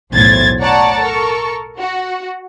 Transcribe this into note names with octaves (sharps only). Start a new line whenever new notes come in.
B1 E2 A2 C5 G#6 A6
C#5 D5 F#5 A5 A#5 C#6
A4 A#4 C#6
F#4